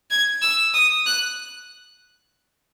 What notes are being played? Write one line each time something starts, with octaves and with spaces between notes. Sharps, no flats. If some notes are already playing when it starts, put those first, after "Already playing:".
G#6
E6
D#6
F#6